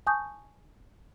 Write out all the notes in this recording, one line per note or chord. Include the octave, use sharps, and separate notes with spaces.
G#5 A5 C#6 D#6 G6